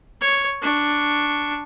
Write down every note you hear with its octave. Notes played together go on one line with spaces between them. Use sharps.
C#5
D4 C#6